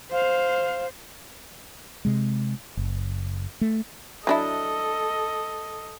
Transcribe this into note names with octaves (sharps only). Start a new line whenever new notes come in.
C5 F5
C3 G#3
F#1
A3
F#3 D4 E4 A4 D#5